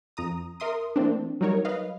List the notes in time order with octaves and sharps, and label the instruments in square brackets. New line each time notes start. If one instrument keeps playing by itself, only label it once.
[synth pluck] F2 A#5 D#6
A#4 E5 C6 D#6
E3 A3 A#3 C4 D4
F#3 G3 D#4 A#4 C#5
B4 D#5 F5